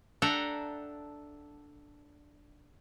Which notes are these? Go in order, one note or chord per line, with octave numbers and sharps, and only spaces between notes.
D4 A4 E5 F#5 G5 A#5